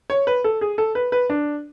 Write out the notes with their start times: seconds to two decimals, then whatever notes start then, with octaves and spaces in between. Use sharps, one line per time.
0.10 C#5
0.27 B4
0.44 A4
0.61 G#4
0.78 A4
0.95 B4
1.12 B4
1.30 D4